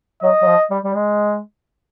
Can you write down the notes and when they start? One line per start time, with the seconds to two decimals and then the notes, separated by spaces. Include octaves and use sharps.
0.22 F#3 D#5
0.42 F#3
0.47 F3
0.71 G3
0.84 G3
0.96 G#3